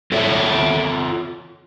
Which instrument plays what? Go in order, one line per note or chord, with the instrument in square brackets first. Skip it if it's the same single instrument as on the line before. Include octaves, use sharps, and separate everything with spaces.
[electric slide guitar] F4 A4 C#5 E5